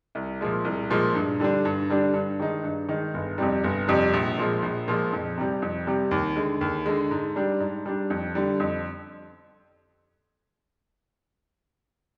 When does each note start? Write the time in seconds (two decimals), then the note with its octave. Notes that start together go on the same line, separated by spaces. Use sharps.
0.15 C2
0.41 A#2 F3 G#3
0.65 C2
0.90 A#2 F3 G#3
1.15 G2
1.40 D3 G3 D4
1.65 G2
1.90 D3 G3 D4
2.14 G2
2.40 D#3 G#3 D#4
2.64 G2
2.89 D#3 G#3 D#4
3.14 G1
3.38 F2 C3 G3
3.64 G1
3.88 F2 C3 G3
4.13 A#1
4.38 A#2 F3 G#3
4.62 A#1
4.88 A#2 F3 G#3
5.13 F2
5.38 C3 G3
5.62 F2
5.87 C3 G3
6.11 D#2
6.36 D3 G#3
6.61 D#2
6.86 D3 G#3
7.11 G#2
7.36 G3 D4
7.60 G#2
7.86 G3 D4
8.10 F2
8.35 D3 G3
8.60 F2